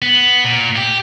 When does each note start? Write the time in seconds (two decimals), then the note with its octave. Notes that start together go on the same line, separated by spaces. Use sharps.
0.02 B3
0.44 A#2
0.77 G4